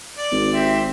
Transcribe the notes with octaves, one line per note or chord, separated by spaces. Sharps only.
D5
G#1
C4 G4 E5